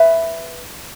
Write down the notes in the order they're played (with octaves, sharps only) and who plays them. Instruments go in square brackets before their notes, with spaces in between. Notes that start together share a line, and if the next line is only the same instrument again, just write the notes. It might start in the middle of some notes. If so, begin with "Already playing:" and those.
Already playing: [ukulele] B4 E5